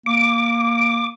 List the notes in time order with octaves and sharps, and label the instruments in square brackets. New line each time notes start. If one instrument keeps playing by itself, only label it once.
[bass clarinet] A#3 [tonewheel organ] D6